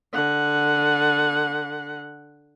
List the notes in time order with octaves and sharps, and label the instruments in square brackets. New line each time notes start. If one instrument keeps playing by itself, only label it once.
[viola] D3 F#5